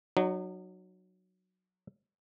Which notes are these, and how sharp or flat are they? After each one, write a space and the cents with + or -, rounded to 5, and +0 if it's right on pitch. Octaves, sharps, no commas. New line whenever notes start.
F#3 +0 D#4 -35